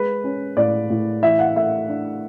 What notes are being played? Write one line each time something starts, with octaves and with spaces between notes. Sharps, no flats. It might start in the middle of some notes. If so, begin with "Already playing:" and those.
Already playing: G#3 B4
C#4
A2 D5
A2
E3 E5
F#5
A3 E5
D4